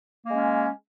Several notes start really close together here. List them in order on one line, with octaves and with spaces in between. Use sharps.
A#3 G#3 C#4